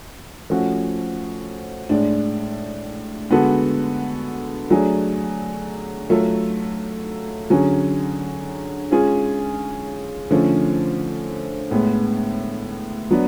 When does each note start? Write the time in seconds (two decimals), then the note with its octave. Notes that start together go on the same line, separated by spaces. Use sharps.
0.50 F3 A3 C#4 F#4
1.89 A2 G#3 D4
3.30 D3 G#3 B3 F#4 A4
4.70 F#3 A3 D4 G#4
6.10 F#3 A3 F4 A4
7.50 D3 F#3 C#4 G#4
8.91 G#3 C#4 F4 G#4
10.31 D3 F3 A3 C#4
11.71 A2 G#3 B3
13.11 F#3 B3 D4